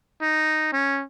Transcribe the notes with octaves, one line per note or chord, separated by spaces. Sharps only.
D#4
C#4